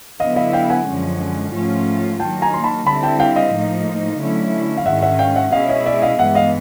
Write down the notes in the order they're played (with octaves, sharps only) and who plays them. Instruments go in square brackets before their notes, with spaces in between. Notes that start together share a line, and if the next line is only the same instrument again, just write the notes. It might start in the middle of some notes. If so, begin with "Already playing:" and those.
[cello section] D3 F#3 B3 E4 [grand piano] D#5 F5
[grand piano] D#5 F5
F5 G5
F#5 G#5
[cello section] F#2 D3 F3 G#3 C#4
G#2 F3 A3 C#4 F4
[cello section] D#3 F#3 A#3 [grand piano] G5 A5
[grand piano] G#5 A#5
C6
A5 B5
[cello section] D3 G3 C4 E4 [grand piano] A5 B5
[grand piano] G5 A5
F5 G5
D#5 F5
[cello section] A2 F3 A#3 D#4
D3 F#3 A3 C#4 E4
[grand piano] F5
[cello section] G#2 D#3 G#3 C#4 [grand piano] E5 F#5
[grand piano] E5 F#5
F5 G5
E5 F#5
[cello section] B2 G#3 C#4 E4 G#4 [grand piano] D#5 F5
[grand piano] C#5 D#5
D5 E5
D#5 F5
[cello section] G2 E3 G#3 B3 [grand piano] E5 F#5
[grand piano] D#5 F5